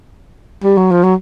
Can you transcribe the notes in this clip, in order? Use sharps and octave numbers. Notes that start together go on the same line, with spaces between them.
G3
F#3
F3
F#3